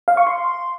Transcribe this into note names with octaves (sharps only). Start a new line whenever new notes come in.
F5
C#6
C6